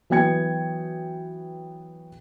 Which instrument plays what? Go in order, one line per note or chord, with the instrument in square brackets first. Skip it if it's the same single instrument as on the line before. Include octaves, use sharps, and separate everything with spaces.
[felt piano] E3 F#3 B3 G5 G#6 C#7